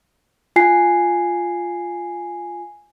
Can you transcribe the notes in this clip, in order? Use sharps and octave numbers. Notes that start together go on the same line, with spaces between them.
F4 G#5 C7